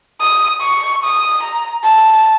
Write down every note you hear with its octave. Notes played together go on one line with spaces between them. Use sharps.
D#6
C#6
D#6
A#5
A5